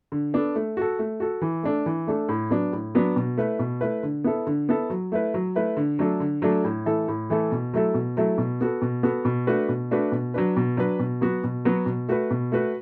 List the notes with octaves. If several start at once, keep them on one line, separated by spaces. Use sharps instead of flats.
D3
B3 D4 A4
A3
F#4 A4
A3
F#4 A4
E3
A3 D4 A4
E3
A3 D4 A4
A2
F#3 B3 D4
A2
F#3 B3 D4
B2
A3 E4 B4
B2
A3 E4 B4
D3
B3 E4 A4
D3
B3 E4 A4
F#3
A3 E4 B4
F#3
A3 E4 B4
D3
F#3 A3 D4 A4
D3
F#3 A3 D4 A4
A2
E3 A3 E4 A4
A2
E3 A3 E4 A4
B2
F#3 A3 E4 A4
B2
F#3 A3 E4 A4
B2
B3 F#4 A4
B2
B3 F#4 A4
B2
A3 D4 F#4 B4
B2
A3 D4 F#4 B4
B2
F#3 D4 B4
B2
F#3 D4 B4
B2
F#3 B3 F#4
B2
F#3 B3 F#4
B2
A3 F#4 B4
B2
A3 F#4 B4